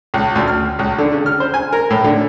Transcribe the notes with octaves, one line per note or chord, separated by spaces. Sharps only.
C#2
D2
F6
C#2
D3
C#3
F6
C5
G#5
A#4
A2
D3